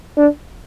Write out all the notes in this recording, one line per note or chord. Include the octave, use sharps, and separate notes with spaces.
D4